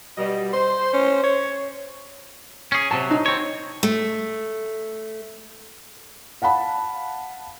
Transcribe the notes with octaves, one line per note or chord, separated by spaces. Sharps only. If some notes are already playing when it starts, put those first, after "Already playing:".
B2 G3 D#5
C5 C6
C#4
C#5
C#4 G#4
C3 F#3 A5
D#4
C4 C#5
A3
F5 F#5 A5 B5